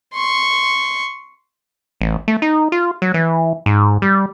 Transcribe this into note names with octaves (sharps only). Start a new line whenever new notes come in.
C6 C#6
A1
A3
D#4
F4
F#3
E3
G#2
G3